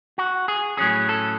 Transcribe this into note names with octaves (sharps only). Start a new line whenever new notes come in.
F#4
G#4
A2 F#3 C#4 G#4
A4